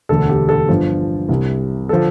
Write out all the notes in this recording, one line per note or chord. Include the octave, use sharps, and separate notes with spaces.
E1 D2 D3 A4
G4
A4
G1 G2 F3
C2 C3 G3
D3 F3 A4